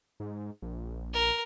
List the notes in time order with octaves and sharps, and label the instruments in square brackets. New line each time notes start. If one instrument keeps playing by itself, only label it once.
[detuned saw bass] G#2
A#1
[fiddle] A#4